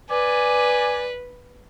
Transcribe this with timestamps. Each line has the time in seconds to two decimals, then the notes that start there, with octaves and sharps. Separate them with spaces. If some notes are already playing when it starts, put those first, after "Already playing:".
0.10 B4 D5 G#5